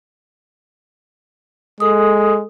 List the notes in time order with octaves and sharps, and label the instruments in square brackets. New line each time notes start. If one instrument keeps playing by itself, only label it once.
[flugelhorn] G#3 [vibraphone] A4 D#6